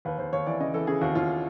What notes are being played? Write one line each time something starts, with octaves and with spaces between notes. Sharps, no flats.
D#2 B4
D#2 C5
D#2 C#5
E3 D5
C#3 D#5
E3 A4
C#3 G#4
D#2 F#4
D#2 F4